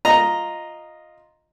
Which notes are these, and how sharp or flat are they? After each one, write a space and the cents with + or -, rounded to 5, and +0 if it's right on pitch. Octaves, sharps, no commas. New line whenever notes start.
F4 +0 D#5 +0 A#5 +0